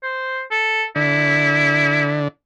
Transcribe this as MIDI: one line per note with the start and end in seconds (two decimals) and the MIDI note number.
0.03 0.41 72
0.51 0.85 69
0.96 2.28 50
0.96 2.27 64